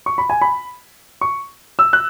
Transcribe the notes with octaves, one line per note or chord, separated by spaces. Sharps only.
C#6
B5
G#5
B5
C#6
E6
F#6